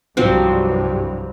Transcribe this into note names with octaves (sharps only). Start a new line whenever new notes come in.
C2 G2 F3 F#3 C4